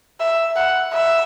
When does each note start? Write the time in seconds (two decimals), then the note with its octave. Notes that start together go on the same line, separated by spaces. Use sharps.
0.20 E5
0.56 F#5
0.93 E5